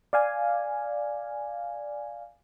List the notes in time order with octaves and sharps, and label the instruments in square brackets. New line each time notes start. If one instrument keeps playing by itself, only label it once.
[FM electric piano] D5 F5 G#5